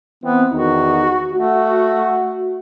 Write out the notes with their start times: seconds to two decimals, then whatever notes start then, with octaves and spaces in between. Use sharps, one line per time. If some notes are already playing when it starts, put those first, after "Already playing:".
0.24 E3 B3 C4
0.52 E2 D#3 D#4 F#4
1.33 A3 F#4